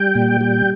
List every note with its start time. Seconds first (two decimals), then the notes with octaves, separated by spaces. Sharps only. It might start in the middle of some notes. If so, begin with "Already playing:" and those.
Already playing: G3 G5
0.15 A#2
0.41 G3